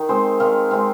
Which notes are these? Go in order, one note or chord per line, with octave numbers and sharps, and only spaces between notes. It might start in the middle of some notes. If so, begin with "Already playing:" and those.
Already playing: D#3
G#3 C4 C5
D#3 F5
G#3 C4 F5